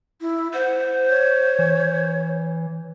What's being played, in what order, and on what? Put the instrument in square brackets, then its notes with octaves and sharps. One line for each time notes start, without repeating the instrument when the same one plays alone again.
[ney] E4
[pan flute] C5 [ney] F#5
[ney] C#5
[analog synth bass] E3